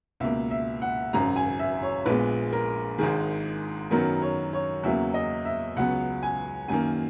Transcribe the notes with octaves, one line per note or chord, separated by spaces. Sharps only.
C#2 B2 A#3 E5
E5
F#5
G#1 F#2 C#3 A#5
G#5
E5
C#5
A#1 A#2 G#3 B3 B4
A#4
G#1 G#2 D#3 G#4
F#2 D#3 F#3 B3 A#4
C#5
C#5
E2 C#3 F#3 A#3 E5
D#5
E5
C#2 C#3 F#3 B3 F#5
G#5
F#2 D#3 A#3 G#5